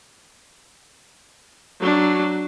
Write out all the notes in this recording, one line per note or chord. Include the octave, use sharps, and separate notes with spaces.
F#3 D4